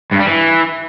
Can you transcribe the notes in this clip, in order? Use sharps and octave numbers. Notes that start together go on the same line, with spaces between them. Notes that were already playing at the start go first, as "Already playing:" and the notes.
G2
G3
E3